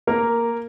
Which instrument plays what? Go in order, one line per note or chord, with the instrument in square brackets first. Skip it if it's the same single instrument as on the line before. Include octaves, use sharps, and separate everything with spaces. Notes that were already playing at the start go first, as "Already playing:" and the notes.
[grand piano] A#3 [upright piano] A#4